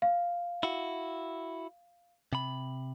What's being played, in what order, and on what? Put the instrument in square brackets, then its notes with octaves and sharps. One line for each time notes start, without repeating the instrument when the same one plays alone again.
[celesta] F5
[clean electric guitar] E4 F#4
C3 B5